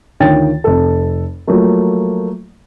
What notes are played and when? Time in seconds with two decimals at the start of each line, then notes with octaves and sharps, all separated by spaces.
0.20 D2 D#3 F4 C#5 G5 A6
0.64 F1 A4
1.47 F3 F#3 A3 A#3